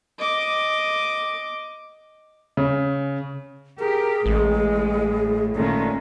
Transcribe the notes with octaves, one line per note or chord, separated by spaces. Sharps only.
D#5 D6
C#3
G4 G#4 A#4
A1 A2 G#3
A#2 D#3 G#3 A3 C#4